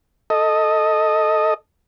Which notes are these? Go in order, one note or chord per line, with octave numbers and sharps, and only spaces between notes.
A4 D#5